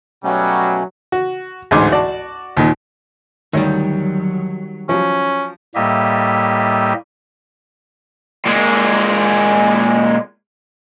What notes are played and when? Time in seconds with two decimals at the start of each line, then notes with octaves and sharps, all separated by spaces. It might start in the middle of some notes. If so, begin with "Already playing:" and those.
0.24 B2 F#3 G3 A3 C#4
1.12 F#4
1.71 A1 D2 G#2 G#5 C6 D6
1.91 F#4 D5 A5
2.57 D#2 A#2 D#3
3.53 D2 D#3 F#3 G3 C#5
4.89 F3 F#3 C#4
5.75 A2 G3 A#3 G4 D#5 E5
8.45 A#2 G#3